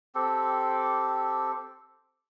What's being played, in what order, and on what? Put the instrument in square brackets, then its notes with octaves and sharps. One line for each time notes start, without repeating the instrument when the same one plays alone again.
[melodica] C4 G4 A4